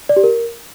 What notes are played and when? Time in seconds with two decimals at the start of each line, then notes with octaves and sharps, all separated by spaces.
0.09 D5
0.16 G4
0.24 A#4